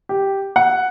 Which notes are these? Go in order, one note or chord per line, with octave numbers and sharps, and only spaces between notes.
G4
F#5